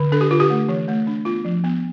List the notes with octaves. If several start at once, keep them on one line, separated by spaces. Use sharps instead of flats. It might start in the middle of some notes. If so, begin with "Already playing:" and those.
Already playing: D3
D4 A4
G4
D3 F4
G4
A3
E3
A3
D4
B3 F4
F3
B3